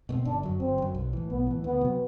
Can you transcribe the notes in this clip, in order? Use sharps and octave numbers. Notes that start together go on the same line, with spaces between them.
B2 A3 C4
G1 D4
F#2 F#3
G1 C4
F#2 F#3
B1
A2 E3
B1 B3
A2 E3
D2 B3
C3 F#3